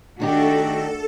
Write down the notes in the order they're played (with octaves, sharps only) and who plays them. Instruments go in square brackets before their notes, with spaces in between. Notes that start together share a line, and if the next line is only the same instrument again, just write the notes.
[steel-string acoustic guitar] D#3 D#4 G4 [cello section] A3 D4 F#4 [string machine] A4